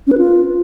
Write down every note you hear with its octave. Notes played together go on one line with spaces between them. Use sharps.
C#4
B4
F4